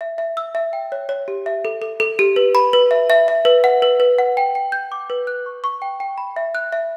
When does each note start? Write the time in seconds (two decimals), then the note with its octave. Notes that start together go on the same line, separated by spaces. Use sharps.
0.01 E5
0.18 E5
0.37 E6
0.55 E5
0.73 G5
0.92 C#5
1.09 C#5
1.28 G4
1.46 E5
1.65 A4
1.82 A4
2.00 A4
2.19 G4
2.36 B4
2.55 B5
2.73 B4
2.91 E5
3.10 E5
3.28 E5
3.45 B4
3.64 F#5
3.82 B4
4.00 B4
4.18 F#5
4.37 G5
4.55 G5
4.72 G6
4.92 D6
5.10 B4
5.27 F#6
5.46 C#6
5.64 C#6
5.82 G5
6.00 G5
6.18 B5
6.36 E5
6.55 F#6
6.72 E5